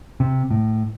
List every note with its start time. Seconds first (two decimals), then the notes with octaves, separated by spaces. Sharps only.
0.20 C3
0.51 A2